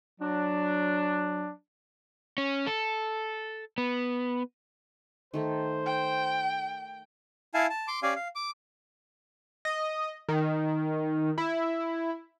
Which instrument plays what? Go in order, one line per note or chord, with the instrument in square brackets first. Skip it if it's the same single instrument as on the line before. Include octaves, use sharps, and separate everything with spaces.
[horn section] F#3 D4
[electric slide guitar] C#4
A4
B3
[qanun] D#3 A3 A4 [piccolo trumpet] C5
[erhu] G5
[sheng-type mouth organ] E4 F5 G#5 A5
A5
C6 D6
C#4 G4 D5 F5 G#5
F5
D6
[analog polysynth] D#5
D#3
E4